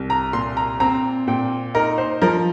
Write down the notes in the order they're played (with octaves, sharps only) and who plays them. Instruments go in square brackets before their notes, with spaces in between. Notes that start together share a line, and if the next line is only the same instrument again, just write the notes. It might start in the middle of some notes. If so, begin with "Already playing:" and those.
Already playing: [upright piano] C2
A#5
A#2 C6
A#5
C4 A#5
A#2 G5
D#4 A#4
C5
F3 A#4